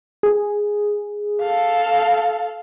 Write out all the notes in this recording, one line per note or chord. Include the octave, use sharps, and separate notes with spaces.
G#4
A4 F5